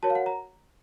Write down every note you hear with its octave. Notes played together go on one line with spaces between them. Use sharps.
F#4 A#4 C#5 A5
F5
F#5
A#5